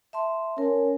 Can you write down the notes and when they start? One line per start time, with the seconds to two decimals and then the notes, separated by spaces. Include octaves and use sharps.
0.13 E5 A5 C6
0.58 C#4 A#4